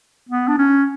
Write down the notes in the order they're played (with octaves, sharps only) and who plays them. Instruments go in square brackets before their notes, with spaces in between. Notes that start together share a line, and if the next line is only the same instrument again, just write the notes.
[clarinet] B3
D4
C#4